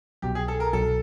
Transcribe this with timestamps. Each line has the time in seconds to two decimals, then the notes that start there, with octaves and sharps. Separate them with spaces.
0.22 C2 B2 F#3 G4
0.35 G#4
0.48 A4
0.60 A#4
0.73 C2 B2 F#3 A4